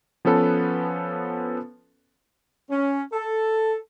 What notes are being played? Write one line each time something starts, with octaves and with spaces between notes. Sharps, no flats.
F3 B3 C#4 A4 B4
C#4
A4